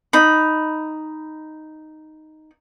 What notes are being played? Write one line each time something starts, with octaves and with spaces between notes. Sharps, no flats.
D#4 B5